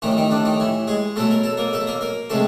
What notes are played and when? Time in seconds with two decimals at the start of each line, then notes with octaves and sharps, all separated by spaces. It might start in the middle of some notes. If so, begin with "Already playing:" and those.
0.02 A2 D#3 E3 G3 D#4
0.17 D#3 D#4
0.30 D3 D4
0.45 D#3 D#4
0.60 E3 E4
0.87 G#3 G#4
1.16 B2 F#3 A3 A4
1.31 A#4
1.43 A4
1.57 A#3 A#4
1.73 A3 A4
1.87 A#3 A#4
2.01 A#3 A#4
2.30 C3 F3 G#3 A3 A4